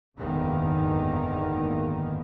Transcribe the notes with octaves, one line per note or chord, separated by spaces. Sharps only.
F#1 E2 G#2 D3 D#3 A#3